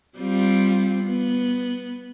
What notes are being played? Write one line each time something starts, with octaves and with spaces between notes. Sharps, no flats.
G3 C4 F4
B3